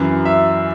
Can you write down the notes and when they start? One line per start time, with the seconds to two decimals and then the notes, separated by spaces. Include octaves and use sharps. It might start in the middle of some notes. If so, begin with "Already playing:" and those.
Already playing: F#2 E3
0.25 E5